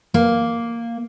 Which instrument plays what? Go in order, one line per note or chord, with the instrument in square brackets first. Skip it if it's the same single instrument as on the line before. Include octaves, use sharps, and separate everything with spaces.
[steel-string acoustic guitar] A#3